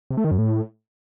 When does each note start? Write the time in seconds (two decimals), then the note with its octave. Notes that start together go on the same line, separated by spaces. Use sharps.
0.11 C3
0.17 A3
0.24 D#3
0.31 F#2
0.38 A2